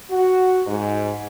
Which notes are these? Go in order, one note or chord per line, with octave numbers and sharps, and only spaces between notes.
F#4
G#2